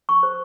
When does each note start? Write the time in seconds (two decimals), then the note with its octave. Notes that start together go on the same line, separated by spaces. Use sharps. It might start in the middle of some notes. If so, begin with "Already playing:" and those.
0.09 C#6
0.23 C5